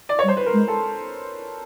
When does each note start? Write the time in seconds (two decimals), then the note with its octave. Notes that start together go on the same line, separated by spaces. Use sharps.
0.09 D5
0.19 C#5
0.24 G3
0.28 C5
0.37 B4
0.46 A#4
0.53 G#3
0.68 A4